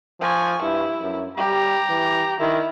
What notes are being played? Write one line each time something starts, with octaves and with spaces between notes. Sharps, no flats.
F3 G#5 C#6
G2 E4
F#2
G3 G4 A#5
E3
D#3 E4